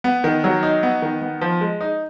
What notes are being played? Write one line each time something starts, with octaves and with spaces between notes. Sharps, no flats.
B3
D#3
F#3
D#4
B3
D#3
B3
F3
G#3
D#4